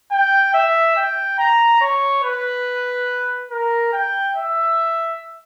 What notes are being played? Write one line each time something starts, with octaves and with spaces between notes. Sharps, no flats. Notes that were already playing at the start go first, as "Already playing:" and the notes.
G5
E5
G5
A#5
C#5
B4
A#4
G5
E5